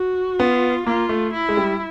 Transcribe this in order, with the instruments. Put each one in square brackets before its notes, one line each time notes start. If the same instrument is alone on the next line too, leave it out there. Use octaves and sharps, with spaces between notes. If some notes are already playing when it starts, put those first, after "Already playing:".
Already playing: [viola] F#4
[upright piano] B3 [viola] F4
[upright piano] A#3 [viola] F4
[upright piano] A3
[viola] E4
[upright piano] G#3
G3